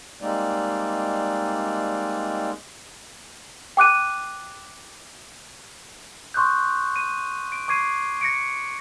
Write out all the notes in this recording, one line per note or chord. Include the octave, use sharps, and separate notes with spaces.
G3 G#3 A#3 C4 D#4 D5
G5 D6 F#6 D#7
C6 C#6 D#6 F#6 G6
D#7
D7
C#6 D6 G#6 C7 D#7
A#6 C#7 D7